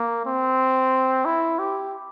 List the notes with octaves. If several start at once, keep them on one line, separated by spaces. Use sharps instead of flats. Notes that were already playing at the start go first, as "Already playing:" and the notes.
Already playing: A#3
C4
E4
G4